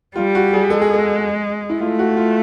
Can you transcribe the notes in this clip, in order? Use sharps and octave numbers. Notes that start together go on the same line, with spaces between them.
G3 F4
F#4
G#4
G#3 A4
G#4
A4
E4
A3 F4
F#4
F4